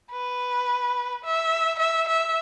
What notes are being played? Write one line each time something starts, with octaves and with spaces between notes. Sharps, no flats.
B4
E5
E5
E5